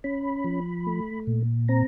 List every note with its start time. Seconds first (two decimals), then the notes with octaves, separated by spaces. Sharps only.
0.04 C#4 B5
0.44 F3
0.87 A3
1.27 A#2
1.69 C4 A#5